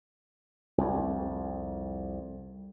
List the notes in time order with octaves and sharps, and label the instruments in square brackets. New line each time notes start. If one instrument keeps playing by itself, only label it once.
[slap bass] C2 F2